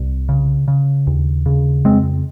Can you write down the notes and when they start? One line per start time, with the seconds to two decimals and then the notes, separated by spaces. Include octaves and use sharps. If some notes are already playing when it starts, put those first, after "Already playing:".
Already playing: C2
0.29 C#3
0.68 C#3
1.07 D#2
1.46 C#3
1.85 F2 G#3 C4